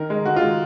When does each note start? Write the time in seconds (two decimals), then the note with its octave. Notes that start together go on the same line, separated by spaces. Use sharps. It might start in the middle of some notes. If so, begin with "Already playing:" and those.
Already playing: D#3 A#4
0.10 G#3
0.25 D#3 F#4
0.36 F4
0.41 G#3